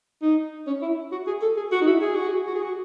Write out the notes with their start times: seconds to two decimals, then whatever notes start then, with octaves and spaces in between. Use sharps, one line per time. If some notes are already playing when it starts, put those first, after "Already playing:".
0.22 D#4
0.67 C#4
0.82 E4
1.12 F#4
1.27 G#4
1.42 A4
1.57 G#4
1.72 F#4
1.81 D#4
1.87 E4
2.02 G#4
2.15 F#4
2.28 G#4
2.47 F#4
2.55 G#4
2.62 F#4